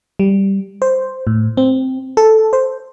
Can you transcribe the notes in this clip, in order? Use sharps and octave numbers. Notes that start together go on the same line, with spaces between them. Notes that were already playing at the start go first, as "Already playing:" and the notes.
G3
C5
A2
C4
A4
C5